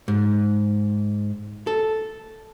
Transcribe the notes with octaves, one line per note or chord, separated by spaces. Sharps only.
G#2
A4